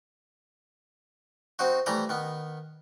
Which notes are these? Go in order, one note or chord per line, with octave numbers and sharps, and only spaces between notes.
C4 D#4 F#4
E3 G3 A3 A#5 B5 D#6
D#3 B3